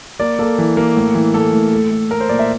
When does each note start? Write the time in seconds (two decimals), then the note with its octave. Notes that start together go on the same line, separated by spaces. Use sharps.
0.20 A#3 D5
0.39 A#3 A4
0.58 E3
0.77 A#3
0.97 A2
1.15 E3
1.34 A2 A4
1.53 A2
1.73 A3
1.91 A3
2.10 A3 A#4
2.20 C5
2.29 A#2 D5
2.39 E5